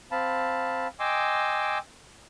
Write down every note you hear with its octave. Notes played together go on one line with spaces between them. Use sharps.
C4 F5 A5 B5
D#5 G5 G#5 C6 D6 E6